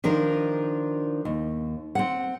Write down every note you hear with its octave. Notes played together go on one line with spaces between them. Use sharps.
D#3 F3 D4 F4 A#4
D#2
C4 F#5